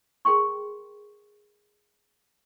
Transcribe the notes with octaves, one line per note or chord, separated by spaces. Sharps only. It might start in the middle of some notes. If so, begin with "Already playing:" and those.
G#4 A#4 G5 C6 C#6